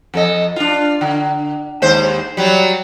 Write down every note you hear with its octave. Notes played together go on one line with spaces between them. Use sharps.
F2 A4 D#5
D4 F4
D3
D#2 G#3 C5
F#3 G3